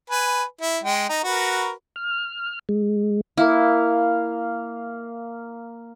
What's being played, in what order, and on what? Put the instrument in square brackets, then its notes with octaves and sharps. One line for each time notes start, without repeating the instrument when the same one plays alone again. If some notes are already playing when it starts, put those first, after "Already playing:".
[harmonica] B4 G#5
E4
G#3 G5
D#4
F#4 A#4 B4
[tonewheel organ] F6
G#3
[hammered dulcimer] A#3 F5 [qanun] E4